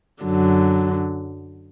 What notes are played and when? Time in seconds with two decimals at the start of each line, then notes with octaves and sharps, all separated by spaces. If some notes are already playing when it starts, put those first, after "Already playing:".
0.24 F#2 D3 F#3